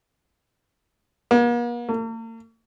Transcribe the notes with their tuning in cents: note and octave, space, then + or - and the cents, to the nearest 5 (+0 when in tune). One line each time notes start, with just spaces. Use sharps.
A#3 +45
A#3 -45